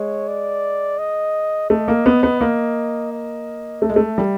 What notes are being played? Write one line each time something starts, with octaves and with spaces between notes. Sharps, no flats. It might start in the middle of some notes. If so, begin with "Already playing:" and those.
Already playing: G#3 C#5
D5
D#5
A3 D#5
A#3
B3
B3
A#3 D#5
D#5
A3 E5
G#3
A3
G3